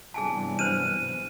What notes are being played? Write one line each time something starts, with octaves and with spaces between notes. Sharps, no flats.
G2 C3 E3 F#3 B3 G#4 G#5 A5
D4 B4 C5 D#7